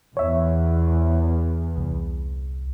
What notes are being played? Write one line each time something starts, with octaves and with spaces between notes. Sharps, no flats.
E2 C#5 E5
C2